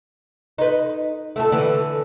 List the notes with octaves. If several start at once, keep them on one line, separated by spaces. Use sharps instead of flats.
D#4 B4
A3 A4
D3 E3